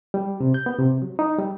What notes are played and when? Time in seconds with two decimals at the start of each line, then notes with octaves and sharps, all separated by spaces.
0.14 G3
0.41 C3
0.54 G6
0.66 B3
0.79 C3
1.02 F#3
1.19 D#4
1.39 G3